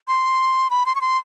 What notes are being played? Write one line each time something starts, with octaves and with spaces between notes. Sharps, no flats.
C6
B5
C6
C#6
C6